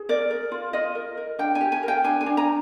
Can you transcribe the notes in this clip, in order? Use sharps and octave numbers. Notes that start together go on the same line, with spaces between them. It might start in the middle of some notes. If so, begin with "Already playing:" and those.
Already playing: G#4
A#4 D5
A#4
F4
F4 D#5
A#4
A#4
D4 G5
G#5
G4
G#5
A#4
G5
D4 G#5
G#5
D4
A#5